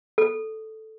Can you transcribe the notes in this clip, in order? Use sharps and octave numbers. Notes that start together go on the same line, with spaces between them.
A4